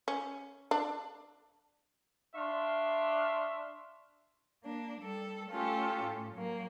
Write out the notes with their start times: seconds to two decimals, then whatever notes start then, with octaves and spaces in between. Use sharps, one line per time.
0.08 C#4
0.71 D4
2.36 D4 C#5 E5 F5 C6
4.63 A#3 D4
5.01 G3 A4
5.49 A3 C#4 F4 G4 A4
6.04 A2
6.34 F#3 A#3